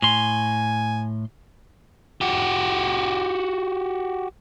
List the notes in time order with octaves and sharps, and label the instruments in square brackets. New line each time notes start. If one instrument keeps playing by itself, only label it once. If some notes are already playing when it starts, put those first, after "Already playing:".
[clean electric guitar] A2 C6 [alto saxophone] G#5
[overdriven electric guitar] F#4 G4